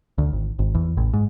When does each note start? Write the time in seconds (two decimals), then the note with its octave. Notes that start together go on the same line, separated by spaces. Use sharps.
0.18 D2
0.33 G#1
0.59 G#1
0.75 E2
0.97 A1
1.13 G#2